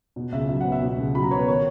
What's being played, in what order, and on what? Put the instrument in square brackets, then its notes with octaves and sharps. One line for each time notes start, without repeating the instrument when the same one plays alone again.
[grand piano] B2
C#2 E5
F#3 E5
B3 F#5
E5
B2
C#2
F#3 B5
A#5
B3 C#5
B4
D#3 C#5